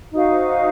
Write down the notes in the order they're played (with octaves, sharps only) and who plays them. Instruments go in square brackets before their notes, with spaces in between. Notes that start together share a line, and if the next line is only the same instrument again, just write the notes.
[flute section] D#4 F#4 C5 F5